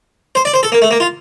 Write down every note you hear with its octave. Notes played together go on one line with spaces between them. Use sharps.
C5
D5
C5
A4
A#3
A3
A#3
F4